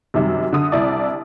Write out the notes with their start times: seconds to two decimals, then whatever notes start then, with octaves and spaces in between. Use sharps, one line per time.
0.14 F#2 C3 D#3 G3
0.53 D3 D#6
0.72 C2 C3 E4 D5